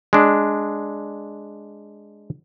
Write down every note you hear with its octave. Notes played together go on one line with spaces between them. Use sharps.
G#3 D4